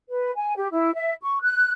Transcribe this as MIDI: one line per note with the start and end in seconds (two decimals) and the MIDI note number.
0.09 0.32 71
0.36 0.55 80
0.57 0.68 67
0.72 0.95 64
0.95 1.14 76
1.22 1.38 85
1.42 1.72 90